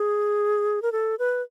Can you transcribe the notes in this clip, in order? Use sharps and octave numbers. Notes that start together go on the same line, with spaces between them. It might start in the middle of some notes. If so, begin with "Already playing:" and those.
Already playing: G#4
A#4
A4
B4